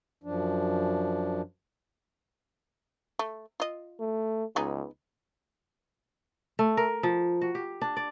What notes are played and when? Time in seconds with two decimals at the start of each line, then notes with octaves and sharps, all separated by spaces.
0.24 F#2 F3 D4
3.19 A3
3.60 F4 D#5
4.00 A3
4.56 C#2 B3 D#4 G#4
6.59 A3
6.77 A#4
7.03 F3
7.42 F#4
7.55 G4
7.82 D4
7.97 D5